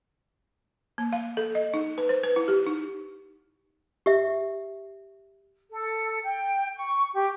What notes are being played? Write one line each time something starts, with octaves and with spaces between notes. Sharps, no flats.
A#3
F5
A4
D#5
D#4
B4
C5
B4
E4
G4
D#4
G4 E5
A4
G5
C#6
G4